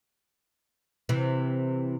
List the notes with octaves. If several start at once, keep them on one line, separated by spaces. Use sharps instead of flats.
C3 E3